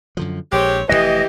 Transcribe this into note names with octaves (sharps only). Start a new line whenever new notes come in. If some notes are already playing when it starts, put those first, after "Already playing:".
F#2 D3 F3
A#1 G#3 C4 G4 C#5
F1 E2 E3 A3 G4 D#5